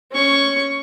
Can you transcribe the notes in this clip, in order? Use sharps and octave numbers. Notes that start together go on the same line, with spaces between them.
C#4 C#6